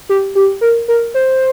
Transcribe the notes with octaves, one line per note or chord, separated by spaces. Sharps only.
G4
G4
A#4
A#4
C5